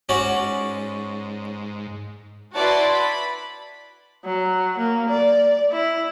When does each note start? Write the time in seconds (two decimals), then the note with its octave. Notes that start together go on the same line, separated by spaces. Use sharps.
0.09 G#2 C#4 F#4 D5
2.54 E4 F#4 B4 D5 A5 C6
2.89 B5
4.25 F#3
4.78 A#3
5.10 D5
5.72 E4